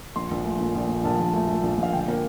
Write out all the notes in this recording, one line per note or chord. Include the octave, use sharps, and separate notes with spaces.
A#1 C6
A#1
A3
A#2
A#1
A#2
A#1 A5
A#1
A3
A3
A#1
A#1 F5
D3 G5
A#3